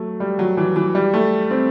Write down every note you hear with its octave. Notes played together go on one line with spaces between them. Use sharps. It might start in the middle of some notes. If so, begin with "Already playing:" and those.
Already playing: F#3 A3
G3
F#3
E3
E3
G3
A3
C4